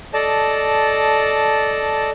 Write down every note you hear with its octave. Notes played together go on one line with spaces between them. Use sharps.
A4 D5 D#5 A5